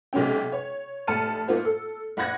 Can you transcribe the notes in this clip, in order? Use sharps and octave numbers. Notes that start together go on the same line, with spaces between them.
B1 C3 G#3 C#4 G5
C#5
F1 A2 A5 F6 C#7 D#7
A#3 B3 D#4 F4 F#4 C5
A4
A#1 F#5 B5 F#6 G#6 A#6